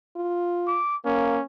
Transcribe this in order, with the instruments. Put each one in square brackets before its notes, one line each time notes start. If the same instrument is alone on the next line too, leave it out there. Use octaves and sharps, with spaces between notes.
[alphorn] F4
[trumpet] D6
[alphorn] A#3 [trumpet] C#4